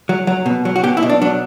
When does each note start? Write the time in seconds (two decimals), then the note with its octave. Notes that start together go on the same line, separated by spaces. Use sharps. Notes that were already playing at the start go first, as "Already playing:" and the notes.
0.09 F#3
0.27 F#3
0.46 B2
0.65 F#3
0.76 F#4
0.84 B2 G4
0.97 E4
1.03 B2
1.10 D4
1.22 F#3 D4